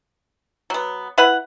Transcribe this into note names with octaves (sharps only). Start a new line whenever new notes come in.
F#3 B3
E4 B4 F#5